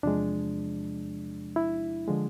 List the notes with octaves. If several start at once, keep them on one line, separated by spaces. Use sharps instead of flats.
E2 C3 F3 G#3 D4
E4
D3 F3 G#3